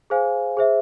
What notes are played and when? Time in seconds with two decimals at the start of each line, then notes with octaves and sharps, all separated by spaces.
0.10 G#4 C5 F5 G#5
0.57 G#4 C5 E5